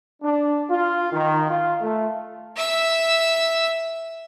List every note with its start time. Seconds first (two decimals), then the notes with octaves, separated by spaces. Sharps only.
0.22 D4
0.70 F4
1.12 D#3
1.47 F4
1.82 A3
2.56 E5 E6